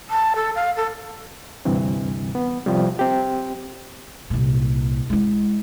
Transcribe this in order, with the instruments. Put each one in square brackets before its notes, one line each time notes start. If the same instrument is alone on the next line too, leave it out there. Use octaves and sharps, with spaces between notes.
[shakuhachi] A5
A4
F5
A4
[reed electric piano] D2 G2 C3 E3 C4
B3
C3 F3 G3
C4 G4
[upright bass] C2 A#2
G#3 E4